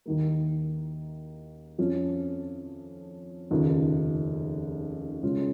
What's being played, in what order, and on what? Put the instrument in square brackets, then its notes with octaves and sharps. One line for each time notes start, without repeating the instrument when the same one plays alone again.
[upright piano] D#2 D#3 A#3
F2 F3 C#4
F1 D#2 C#3 F3
C#2 C#3 G#3 C#4 F4